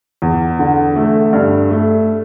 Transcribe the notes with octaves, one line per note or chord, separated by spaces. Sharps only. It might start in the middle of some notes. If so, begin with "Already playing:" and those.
E2
D3
A3
G2
A3